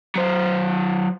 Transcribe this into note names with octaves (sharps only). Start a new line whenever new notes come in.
F#3 C5